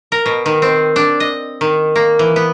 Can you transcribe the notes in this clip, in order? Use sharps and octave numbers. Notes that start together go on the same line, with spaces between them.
A#4
B2
D#3
C4
D4
D#5
D#3
A#3
E3
B3